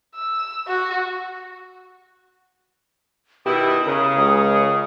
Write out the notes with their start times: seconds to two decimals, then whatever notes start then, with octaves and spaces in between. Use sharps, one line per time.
0.15 E6
0.68 F#4
3.46 B2 D#3 E4 G4 D#6
3.87 C#3 A#4
4.17 C#2